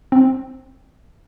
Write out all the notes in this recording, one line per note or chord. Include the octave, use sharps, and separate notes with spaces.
C4